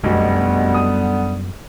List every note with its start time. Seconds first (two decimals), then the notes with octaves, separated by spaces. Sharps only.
0.03 F1 B1 F#2 B2 D3 G3 B3
0.74 D#6